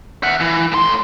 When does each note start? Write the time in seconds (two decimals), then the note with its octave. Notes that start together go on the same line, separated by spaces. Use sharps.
0.23 E5 F#5
0.40 E3
0.72 A2 C6